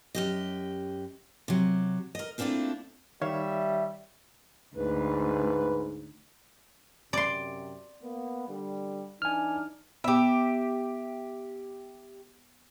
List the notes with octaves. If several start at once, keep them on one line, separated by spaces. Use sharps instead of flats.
F#2 G4 D#5
C3 F#3
A#4 D#5
A3 A#3 C4 D4 E4 F4
D#3 G3 C#5 E5 F5
D2 G#2 B4
F#2 C3 D5 C6
A#3 B3
D3 G3
E3 D4 D#4 G#5 F6
B3 G4 E5